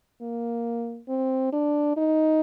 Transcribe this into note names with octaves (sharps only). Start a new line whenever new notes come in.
A#3
C4
D4
D#4